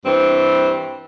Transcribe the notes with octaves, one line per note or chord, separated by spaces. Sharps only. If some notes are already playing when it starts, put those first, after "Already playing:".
G2 E3 C4